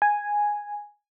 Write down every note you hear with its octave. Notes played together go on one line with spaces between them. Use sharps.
G#5